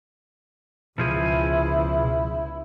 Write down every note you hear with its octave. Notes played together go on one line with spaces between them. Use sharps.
C#2 B2 F3 E4 G#4